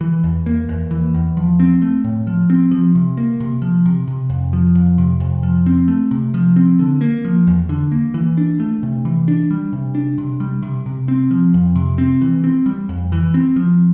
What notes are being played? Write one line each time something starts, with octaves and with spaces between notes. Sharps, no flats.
E3
E2
A#3
E2
E3
E2
F3
C4
A3
A2
F3
C4
F3
C3
A#3
C3
F3
C3
C3
F2
F3
F2
C3
F2
F3
C4
A3
C3
F3
C4
D3
A#3
F3
E2
D3
A#3
E3
D4
A3
C3
E3
D4
G3
C3
D4
C3
G3
C3
C3
C4
F3
F2
C3
C4
E3
C4
G3
F2
E3
C4
F3